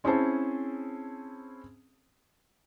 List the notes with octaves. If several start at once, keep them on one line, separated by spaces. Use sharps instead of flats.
C4 C#4 E4 G#4 C5 A5